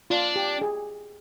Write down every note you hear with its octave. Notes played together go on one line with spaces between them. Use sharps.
D4 F4
G4
G#4